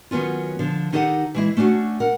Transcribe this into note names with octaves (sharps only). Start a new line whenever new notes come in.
D#3 F#3 B3 C#4 F4
D3 F3
D#3 D#4 G4 A4 F5 F#5
E3 G#3 E4
A3 C#4 D4 F#4
A#4 F#5